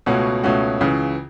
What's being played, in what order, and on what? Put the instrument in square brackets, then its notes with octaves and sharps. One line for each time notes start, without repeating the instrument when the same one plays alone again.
[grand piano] C#2 B2 A3 C#4 F#4
C#2 B2 A3 C#4 F#4
C#2 C#3 E3